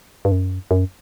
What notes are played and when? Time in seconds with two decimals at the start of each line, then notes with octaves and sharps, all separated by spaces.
0.25 G2
0.32 F#2
0.71 F#2